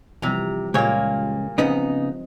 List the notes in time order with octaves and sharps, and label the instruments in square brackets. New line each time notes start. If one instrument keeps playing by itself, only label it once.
[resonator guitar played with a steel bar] C3 A#5 [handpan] E3 F3 G3
[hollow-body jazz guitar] C#2 C#5 [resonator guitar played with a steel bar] A#2 A#3 [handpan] G#3
[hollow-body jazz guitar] C#3 B3 D#4 [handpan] F3 C4 D#5